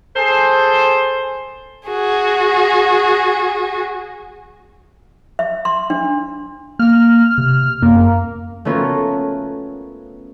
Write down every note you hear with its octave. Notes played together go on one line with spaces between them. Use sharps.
G#4 A4 C5
F#4 G#4
E5
C6
D4
A#3 F6
C3
F#2 A#3
A3 B3 C#4 F4 F#4 A#4